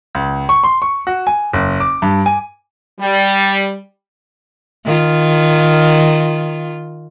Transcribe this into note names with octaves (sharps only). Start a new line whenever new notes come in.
C#2
C#6
C6
C#6
F#4
G#5
F#1
D6
G2
G#5
G3
D#3 F4